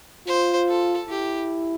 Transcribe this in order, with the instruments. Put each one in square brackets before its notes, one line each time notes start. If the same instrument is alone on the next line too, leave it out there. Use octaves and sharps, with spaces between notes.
[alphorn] F4 [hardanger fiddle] C5
[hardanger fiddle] A4
[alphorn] E4 [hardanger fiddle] G4